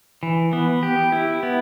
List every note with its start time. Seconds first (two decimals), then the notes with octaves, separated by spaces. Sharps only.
0.23 E3
0.53 B3
0.83 G4
1.12 E4
1.43 B3